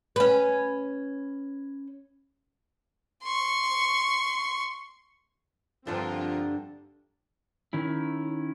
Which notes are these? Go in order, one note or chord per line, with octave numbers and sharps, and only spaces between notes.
C#4 B4
C6 C#6
G2 D3 F3 C4 F4 A#4
D#3 C#4 E4